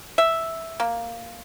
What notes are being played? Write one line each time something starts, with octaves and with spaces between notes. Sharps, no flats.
E5
A#3